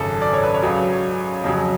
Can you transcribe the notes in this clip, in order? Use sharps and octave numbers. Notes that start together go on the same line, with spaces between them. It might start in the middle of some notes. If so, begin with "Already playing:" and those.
Already playing: G#1 F#2 C#3 A4
D5
C#5
B4
C#5
C#2 C#3 F#3
F2 C#3 F#3